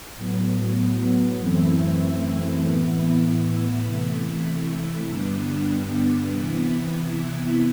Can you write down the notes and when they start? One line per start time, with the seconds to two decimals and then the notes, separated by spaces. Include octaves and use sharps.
0.16 A2 F#3 B3
1.39 F#2 E3 A3 C4 E4
2.63 A2 E3 B3 E4
3.85 C3 E3 A3 E4
5.09 G2 D3 G3 B3 D4
6.32 C3 E3 B3 E4